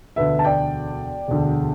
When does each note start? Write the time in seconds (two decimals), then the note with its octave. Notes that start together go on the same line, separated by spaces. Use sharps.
0.16 E1 D2 D3 B4 E5
0.39 A5
0.45 D5 G5
1.28 E1 D2 D3